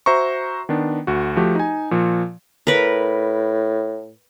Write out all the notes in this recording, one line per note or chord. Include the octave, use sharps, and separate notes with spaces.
F#4 C5 E5 A#5 C#6
D#3 B3 D4
D2 F#4
F3 A3 F#4 G4
D#4 G#5
A#2 F3
A2 A#4 B4